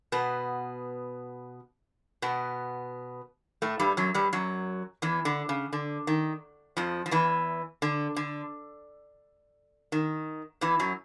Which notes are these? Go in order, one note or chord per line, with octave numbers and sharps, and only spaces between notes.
B2 B3
B2 B3
A2 A3
G2 G3
F#2 F#3
G2 G3
F#2 F#3
E2 E3
D3
C#3
D3
D#3
F2 F3
F3
E2 E3
D3
D3
D#3
E2 E3
F#2 F#3